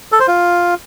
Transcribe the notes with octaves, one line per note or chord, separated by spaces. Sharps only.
A4
C5
F4